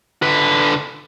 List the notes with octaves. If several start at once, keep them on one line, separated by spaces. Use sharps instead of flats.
D3 B4